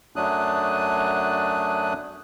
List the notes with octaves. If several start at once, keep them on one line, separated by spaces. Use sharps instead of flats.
F#2 F#3 A3 D4 D#6 F#6